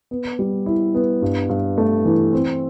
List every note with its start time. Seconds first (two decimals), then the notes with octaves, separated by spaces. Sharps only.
0.11 B3
0.39 G3
0.66 E4
0.95 B3
1.22 G2
1.49 G2
1.78 A3
2.05 E3
2.33 C4